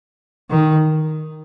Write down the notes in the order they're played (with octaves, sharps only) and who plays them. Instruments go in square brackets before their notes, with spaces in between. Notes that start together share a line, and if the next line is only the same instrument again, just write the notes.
[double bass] D#3